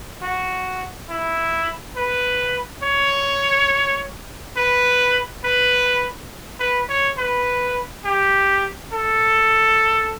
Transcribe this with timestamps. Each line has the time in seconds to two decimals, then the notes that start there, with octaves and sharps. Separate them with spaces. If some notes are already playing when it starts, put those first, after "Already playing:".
0.22 F#4
1.09 E4
1.97 B4
2.83 C#5
4.57 B4
5.44 B4
6.60 B4
6.89 C#5
7.18 B4
8.05 G4
8.93 A4